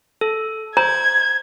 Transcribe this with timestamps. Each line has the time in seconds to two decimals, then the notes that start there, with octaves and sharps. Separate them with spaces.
0.21 A4
0.77 C5 A#5 G#6